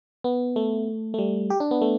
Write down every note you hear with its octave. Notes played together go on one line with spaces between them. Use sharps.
B3
A3
A3
G3
G4
D4
B3
A3